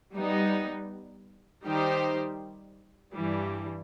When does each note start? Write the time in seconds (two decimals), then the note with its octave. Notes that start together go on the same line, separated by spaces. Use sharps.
0.15 G3 B3 D#4
1.64 D#3 G3 D#4 G4 C5
3.13 G2 E3 G3